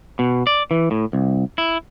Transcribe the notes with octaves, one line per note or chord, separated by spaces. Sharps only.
B2
D5
E3
A2
C2
E4